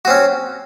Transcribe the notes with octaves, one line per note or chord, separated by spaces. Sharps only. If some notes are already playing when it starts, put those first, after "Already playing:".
C4 C#4 F#4